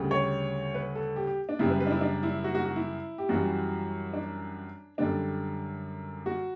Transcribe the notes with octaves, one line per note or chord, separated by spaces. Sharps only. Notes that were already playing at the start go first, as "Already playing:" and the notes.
Already playing: D2 C#3 G3
C#5
B4
A4
G4
G4
D4
F#2 C#3 G3 E4
B4
B4
D4
E4
D4
E4
F#4
F#4
F#4
E4
G4
F#2 E3 G3 F#4
D4
F#2 D3 G3 D4
F#4